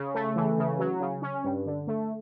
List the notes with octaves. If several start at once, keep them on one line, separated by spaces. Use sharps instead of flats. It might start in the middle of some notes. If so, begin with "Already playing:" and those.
Already playing: C#3
A3
E3
C#3
F#3
C#3
C#4
G2
D3
A3